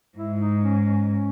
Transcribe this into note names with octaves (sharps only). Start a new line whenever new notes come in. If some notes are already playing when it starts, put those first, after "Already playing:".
G#2 E4
D#4
C#4
C#4
C#4